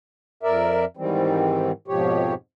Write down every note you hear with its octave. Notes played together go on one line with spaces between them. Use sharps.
F2 A#4 D5 E5
G#2 D#3 E3 G3 C4
F2 G#2 B2 F3 G4 C#5